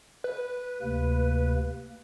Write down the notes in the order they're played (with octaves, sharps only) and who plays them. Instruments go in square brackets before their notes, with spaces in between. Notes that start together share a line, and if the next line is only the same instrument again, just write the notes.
[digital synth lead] B4
[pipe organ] D2 C3 A#3